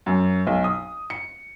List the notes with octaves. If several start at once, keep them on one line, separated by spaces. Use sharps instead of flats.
F#2
B1
D#6
C#7